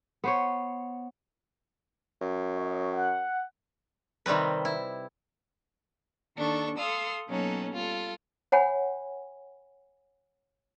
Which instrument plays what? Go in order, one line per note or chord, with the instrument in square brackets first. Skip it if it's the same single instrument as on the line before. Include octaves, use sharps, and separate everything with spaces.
[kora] B3 C5 C#5
[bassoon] F#2
[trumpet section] C#5 D#5
F#5
[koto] C3 D#3 G3 C4 B4
E4
[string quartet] D#2 D#3 D4 A4 C#6
A4 F5 C6 D#6 E6
B2 F#3 A#3 C#4 D#4 A4
G3 F4 A4
[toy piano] C#5 F#5 G#5 B5